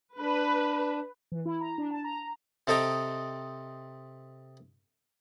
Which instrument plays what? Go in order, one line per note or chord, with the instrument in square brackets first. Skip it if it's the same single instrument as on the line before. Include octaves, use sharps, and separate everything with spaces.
[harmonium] D4 [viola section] B4
[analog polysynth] E3
E4
A#5
D4
A5
A#5
[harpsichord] C3 C4 A4 D#5 G5 A#5